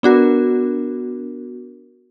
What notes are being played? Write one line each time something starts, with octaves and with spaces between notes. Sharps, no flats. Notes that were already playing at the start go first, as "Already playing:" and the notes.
B3 D4 F#4 A#4